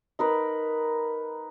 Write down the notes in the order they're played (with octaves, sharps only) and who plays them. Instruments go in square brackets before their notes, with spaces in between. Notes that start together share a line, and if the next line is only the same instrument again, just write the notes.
[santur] D#4 A#4 B4